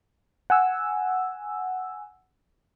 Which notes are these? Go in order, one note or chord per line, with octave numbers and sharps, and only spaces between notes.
F#5 G#5 E6